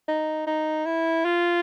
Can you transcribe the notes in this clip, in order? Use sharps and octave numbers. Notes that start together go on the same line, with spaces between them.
D#4
D#4
E4
F4